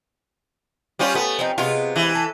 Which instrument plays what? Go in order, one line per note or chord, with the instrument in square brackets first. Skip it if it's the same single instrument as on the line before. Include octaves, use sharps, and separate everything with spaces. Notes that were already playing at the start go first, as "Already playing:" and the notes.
[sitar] G3 C#4 F4
[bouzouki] A3 [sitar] B3
[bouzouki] F3 C4 D#4
[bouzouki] C3 G#3 B3 [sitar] F4
[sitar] E3
[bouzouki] A4